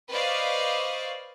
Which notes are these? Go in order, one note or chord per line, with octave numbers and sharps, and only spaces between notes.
B4 C5 D5 D#5 F5 C#6